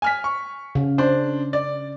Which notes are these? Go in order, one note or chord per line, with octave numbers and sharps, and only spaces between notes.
G#5 F6 B6
C#6
C#3
D4 C5
D5